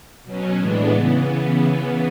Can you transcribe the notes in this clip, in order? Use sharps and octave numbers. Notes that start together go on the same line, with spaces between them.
B2 F#3 C#4
A2 E3 G#3 B3 D4
C#3 E3 B3